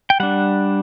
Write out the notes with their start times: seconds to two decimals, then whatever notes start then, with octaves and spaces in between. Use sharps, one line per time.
0.10 G5
0.20 G3 D4 F#5